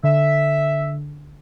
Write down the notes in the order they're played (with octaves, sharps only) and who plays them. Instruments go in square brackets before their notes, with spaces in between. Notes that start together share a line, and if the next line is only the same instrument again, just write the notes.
[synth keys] D3 [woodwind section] E5